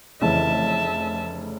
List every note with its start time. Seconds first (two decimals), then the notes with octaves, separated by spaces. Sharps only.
0.21 F1 C#3 E3 E5 A5